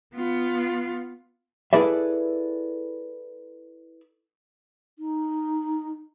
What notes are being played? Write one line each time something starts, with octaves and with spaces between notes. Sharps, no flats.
B3 F4
E4 G#4 A4 B4 D5 E5
D#4